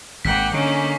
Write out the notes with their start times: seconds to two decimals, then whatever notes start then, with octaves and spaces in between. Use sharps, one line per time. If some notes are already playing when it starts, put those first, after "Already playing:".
0.25 G#1 A#3 F#5 G5 B6
0.54 D3 A#3 C#4 D#4